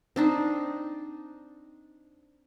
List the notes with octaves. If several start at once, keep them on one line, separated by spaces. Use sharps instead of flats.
C4 D4 D#4